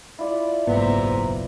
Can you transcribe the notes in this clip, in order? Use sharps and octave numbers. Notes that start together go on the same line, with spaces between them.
E4 F4 D5
F#1 B1 G#2 A#3 B3 C5 E5 A#5